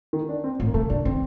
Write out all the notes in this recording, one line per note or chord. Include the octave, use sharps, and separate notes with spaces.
D#3
D4
C4
A2
A#3
C3 A3
D3 D4
D#3 C4